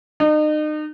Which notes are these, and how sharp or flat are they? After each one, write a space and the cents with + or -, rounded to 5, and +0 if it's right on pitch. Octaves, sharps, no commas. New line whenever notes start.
D#4 -35